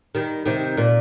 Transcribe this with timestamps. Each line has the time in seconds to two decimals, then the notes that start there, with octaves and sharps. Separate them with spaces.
0.15 D#3 G3
0.46 C3 D#3
0.78 A#2